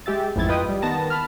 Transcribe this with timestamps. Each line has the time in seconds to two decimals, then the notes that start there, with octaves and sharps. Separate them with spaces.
0.06 G#3 G4 E5 A6
0.36 A1 F2 G#2 E4 G#6 A6
0.49 F4 B4 D#5 G5 D#6
0.69 G3
0.82 D#3 B3 A5 A#6
1.10 A5 B5 F6